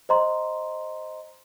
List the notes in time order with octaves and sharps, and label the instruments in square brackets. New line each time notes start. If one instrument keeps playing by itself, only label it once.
[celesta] C5 D#5 A#5 C6